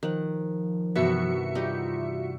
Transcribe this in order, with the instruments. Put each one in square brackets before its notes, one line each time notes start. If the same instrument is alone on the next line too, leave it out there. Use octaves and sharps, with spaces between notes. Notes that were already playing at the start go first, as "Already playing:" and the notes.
[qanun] D#3 F#5 [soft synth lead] F3
[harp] G2 C3 E3 [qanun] B3 [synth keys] F#4 E5 C#7
[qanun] G3 D#4 G4 [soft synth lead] F4